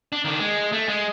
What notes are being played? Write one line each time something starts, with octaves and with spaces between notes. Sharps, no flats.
D4
D#3 D4
G#3
A3
G#3